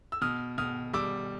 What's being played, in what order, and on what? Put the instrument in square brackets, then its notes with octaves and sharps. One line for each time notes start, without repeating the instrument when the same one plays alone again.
[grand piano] E6
B2 D#6 F6
B2 D#6 F6
G3 D6 E6